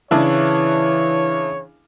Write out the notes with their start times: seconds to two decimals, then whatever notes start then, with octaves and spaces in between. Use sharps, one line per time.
0.11 C#3 E3 D4 E4 C#5